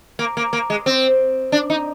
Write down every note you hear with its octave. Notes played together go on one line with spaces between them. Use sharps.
A#3
A#3
A#3
G#3
C4
D4
D#4